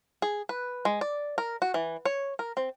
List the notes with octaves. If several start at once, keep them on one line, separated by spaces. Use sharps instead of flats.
G#4
B4
G#3
D5
A#4
F#4
E3
C#5
A#4
C4